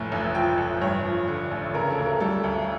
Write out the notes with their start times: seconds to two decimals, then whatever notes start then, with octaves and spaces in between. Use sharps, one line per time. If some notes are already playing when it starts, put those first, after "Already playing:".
Already playing: F1 A2
0.12 A1
0.35 F3 G5
0.58 A1
0.81 G2 C#5
1.05 F3
1.28 D3
1.51 A1
1.74 C#3 A#4
1.90 A4
1.98 D2
2.06 A#4
2.20 G3 A4
2.44 D2